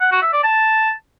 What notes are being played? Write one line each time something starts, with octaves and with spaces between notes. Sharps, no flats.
F#5
F#4
E5
D5
A5